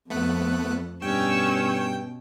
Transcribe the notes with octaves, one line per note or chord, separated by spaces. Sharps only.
F2 A3 B3 F#6
G2 B2 C#4 G5 C#6 E6